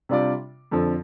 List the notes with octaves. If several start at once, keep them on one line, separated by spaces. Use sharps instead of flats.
C3 G3 D4 F4 D5
F2 D3 F3